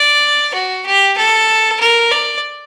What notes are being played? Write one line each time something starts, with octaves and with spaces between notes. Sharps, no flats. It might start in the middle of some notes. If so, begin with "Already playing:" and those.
Already playing: D5
F#4
G4
A4
A#4
D5